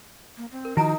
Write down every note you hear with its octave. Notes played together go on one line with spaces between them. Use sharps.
A#3
C4
A#4
D#3 F3 D#4 E4 F#4 G#5 A#5